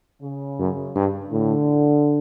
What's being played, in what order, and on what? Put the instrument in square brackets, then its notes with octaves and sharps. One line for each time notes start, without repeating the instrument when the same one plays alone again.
[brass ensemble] C#3
[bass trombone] F#2
G2
[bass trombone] A2 [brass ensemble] D3